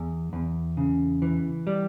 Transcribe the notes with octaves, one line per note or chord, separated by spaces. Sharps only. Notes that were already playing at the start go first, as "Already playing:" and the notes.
Already playing: E2
E2
C#3
E3
G3